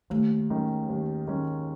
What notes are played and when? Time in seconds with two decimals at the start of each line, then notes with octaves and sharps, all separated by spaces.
0.10 D#2 A3
0.50 D#3 G#3 C#4
0.89 D#2
1.27 D#3 G#3 C#4